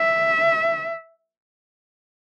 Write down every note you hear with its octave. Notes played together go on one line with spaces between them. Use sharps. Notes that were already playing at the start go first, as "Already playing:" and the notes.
Already playing: E5